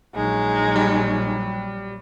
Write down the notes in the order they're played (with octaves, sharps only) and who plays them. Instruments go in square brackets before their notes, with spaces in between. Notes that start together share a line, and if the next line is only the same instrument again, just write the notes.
[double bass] A#1 F#3 [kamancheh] G#3 D#4
[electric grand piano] G3